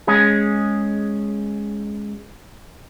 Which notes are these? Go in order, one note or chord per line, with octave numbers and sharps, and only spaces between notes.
G#3 C#4 G#4